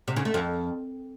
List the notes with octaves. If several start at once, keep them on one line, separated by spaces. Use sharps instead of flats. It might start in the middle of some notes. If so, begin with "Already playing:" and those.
C3
C#3
A3
F2